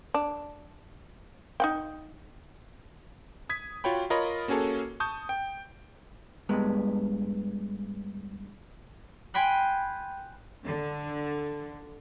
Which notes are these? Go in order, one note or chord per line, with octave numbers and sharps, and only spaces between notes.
D4
D#4 F#5 G5
D#6 G#6 B6
F4 F#4 C#5 G5 B5
F4 A#4 C#5 D#5 B5
A#3 C#4 F#4 G#4 A4 C#5
A5 C#6 D#6 G6
G5
G2 G#3 B3
G5 G#5 B5 C6 F#6
D3